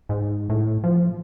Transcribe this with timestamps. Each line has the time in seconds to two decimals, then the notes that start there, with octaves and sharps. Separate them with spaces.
0.09 G#2
0.50 A2
0.84 F3